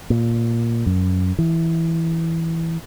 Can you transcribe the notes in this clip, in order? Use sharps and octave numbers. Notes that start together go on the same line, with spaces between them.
A#2
F#2
E3